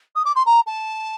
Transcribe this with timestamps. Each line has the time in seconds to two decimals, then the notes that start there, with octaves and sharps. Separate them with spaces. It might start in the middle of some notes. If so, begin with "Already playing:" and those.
0.15 D#6
0.25 D6
0.35 C6
0.45 A#5
0.66 A5